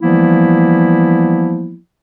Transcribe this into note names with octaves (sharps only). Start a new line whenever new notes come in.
E3 F3 G3 A#3 B3 E4